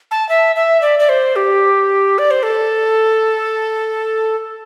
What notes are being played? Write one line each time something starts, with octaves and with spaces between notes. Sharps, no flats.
A5
E5
E5
D5
D5
C5
G4
D5
C5
A4